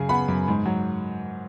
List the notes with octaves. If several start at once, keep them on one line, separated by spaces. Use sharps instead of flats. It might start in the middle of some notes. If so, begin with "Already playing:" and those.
Already playing: F#2 C#3 G#5
B3 F#5 B5
F#2
G#2
F#3